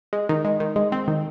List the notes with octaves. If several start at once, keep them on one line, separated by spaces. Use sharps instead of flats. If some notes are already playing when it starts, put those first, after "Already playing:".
G#3
D#3
G#3
D#3
G#3
C4
D#3